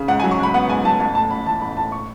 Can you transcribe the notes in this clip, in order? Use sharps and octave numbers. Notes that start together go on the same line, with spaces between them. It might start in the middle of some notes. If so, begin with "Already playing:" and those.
Already playing: C#3
G#2 F#5
F#3 G#5
C#6
G#2 B5
B3 F#5
G#2 G#5
F#3 A5
A1 A5
A2 A5
A1 B5
E3 A5
A1 B5
A2 A5
C#6